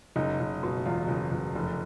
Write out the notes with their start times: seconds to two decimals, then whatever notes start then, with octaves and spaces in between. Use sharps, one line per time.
0.16 F#1 D#4
0.40 F#1
0.63 B2
0.86 E2 F4
1.08 F#1
1.32 F#1
1.55 F1